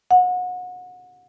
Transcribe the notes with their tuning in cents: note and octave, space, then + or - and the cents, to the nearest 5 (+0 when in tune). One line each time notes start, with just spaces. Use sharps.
F#5 -30